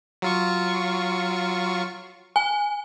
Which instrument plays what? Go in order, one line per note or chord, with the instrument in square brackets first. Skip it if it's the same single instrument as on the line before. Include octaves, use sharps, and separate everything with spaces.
[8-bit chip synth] F#3 F4 C#6
[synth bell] G#5